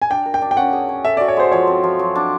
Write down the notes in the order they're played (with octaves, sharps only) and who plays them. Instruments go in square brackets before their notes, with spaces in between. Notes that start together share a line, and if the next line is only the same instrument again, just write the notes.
[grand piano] G#5
[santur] D4 [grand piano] G5
[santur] A#4
[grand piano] G5
[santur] D4
[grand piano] G5
[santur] C#4 [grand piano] F#5
[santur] G#4
C#4
[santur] A4 [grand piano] E5
[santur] F#4 [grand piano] D5
[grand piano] C#5
[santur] G#3 [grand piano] C5
[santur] F3 [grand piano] C#5
[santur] C4
F3
F#3
D4